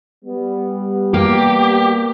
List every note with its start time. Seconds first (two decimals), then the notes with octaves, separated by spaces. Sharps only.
0.24 G3 B3
1.14 A#3 G4